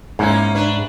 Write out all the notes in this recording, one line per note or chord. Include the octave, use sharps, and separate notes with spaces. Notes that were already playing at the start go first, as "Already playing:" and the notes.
G#2 A#3 C#4 E4
D4 B4